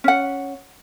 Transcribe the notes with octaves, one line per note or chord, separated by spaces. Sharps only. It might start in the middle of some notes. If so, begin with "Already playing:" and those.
C#4 F#5